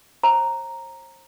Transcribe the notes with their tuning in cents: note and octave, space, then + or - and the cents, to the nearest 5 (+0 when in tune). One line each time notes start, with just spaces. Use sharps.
C5 +40 A#5 +0